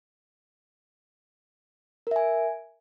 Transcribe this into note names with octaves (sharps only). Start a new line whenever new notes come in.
A#4 E5 G#5